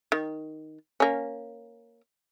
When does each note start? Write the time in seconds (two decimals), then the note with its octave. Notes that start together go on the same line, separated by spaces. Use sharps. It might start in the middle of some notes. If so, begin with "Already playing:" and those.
0.12 D#3
1.00 A#3 C#4